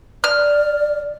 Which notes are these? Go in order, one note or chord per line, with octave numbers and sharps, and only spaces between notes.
D5 F6